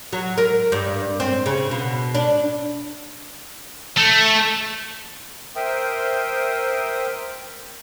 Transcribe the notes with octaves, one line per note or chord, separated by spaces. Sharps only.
F#3
A#4
G2
C4
C#3
B2
D4
A3
A#4 C5 E5 G5 D#6